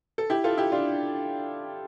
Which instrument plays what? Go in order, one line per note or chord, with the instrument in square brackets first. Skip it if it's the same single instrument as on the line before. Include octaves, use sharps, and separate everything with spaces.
[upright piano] A4
E4 G4
F4 A4
E4 G4
D4 F4